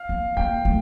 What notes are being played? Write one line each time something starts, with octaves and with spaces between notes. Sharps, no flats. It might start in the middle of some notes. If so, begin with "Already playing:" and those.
Already playing: F5
A#3
A#3 G5
A3